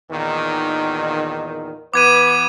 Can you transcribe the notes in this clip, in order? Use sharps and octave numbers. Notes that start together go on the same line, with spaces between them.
E2 A#2 D#3
E3 B3 B4 D6 G#6 D#7